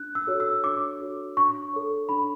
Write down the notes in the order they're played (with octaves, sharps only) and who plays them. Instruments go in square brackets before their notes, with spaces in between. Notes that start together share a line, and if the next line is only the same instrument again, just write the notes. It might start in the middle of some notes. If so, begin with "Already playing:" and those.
Already playing: [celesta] D4 F#6
E6
F#4 A4 C#5
E6
D4 D6
F#4 A4 C#5
D4 C#6
A4 C#5
D4 B5